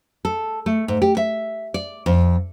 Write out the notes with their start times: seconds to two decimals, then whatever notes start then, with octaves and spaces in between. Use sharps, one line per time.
0.25 A4
0.66 A3
0.88 G#2
1.02 G4
1.17 E5
1.74 D5
2.06 F2